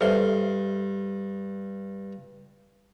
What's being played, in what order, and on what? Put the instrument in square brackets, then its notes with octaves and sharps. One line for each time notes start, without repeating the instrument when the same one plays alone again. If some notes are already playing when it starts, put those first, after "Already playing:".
[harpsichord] G2 C6 [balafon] A4 C5 E5